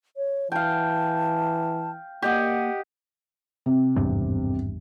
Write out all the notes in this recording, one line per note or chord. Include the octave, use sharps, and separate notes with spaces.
C#5
E3 F5 G5 A5
A#3 G4 D#5 F#5
C3
G#1 E2 G2